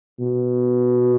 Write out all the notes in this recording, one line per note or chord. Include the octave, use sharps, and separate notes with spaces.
B2